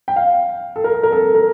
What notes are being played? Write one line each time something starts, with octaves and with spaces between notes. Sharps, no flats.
G5
F5
A4
A#4
A4
A#4
A4
A#4